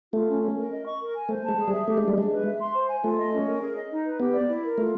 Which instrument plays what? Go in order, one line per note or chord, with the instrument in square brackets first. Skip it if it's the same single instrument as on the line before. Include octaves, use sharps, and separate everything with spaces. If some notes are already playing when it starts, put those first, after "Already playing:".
[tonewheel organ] A3 [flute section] F4
[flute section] C#4
C#4
A#4
D#5
C#6
A#4
G#5
[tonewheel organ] A3 [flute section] C5
[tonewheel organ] G#3 [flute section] A5
[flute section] G#4
[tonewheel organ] G3
[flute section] E5
[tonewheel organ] A3 [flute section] G4
[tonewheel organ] G#3 [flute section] D4
[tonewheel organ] G3
[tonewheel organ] G#3 [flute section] D4
[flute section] B4
E5
C6
C5
G#5
[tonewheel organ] A3 [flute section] F4
[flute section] D#5
C#4
A#4
G#4
D#5
D#4
B4
[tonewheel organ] B3 [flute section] G4
[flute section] D5
E4
A#4
[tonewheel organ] A3 [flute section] F4